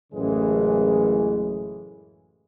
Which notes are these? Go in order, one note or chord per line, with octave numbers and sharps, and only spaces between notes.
A1 F#2 A2 C#3 E3 G#3